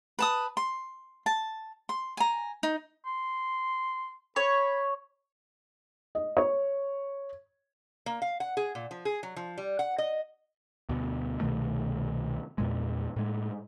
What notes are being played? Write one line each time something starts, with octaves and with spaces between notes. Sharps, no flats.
B4 A5 D#6
C6
A5
C6
G#5 A#5
D#4
C6
C#5 B5
D#5
C#5
A#3
F5
F#5
G#4
A#2
F3
G#4
F#3
F3
G3
F#5
D#5
D2 B2
C2 B2 D#3 A3
E2 A#2 G#3
A2 G#3